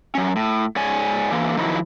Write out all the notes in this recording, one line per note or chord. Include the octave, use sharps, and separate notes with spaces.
F#3 C#4
A2
G#2 C#5 D5 G#5
D3 E3 A#3
D#3 F3 F#3 E4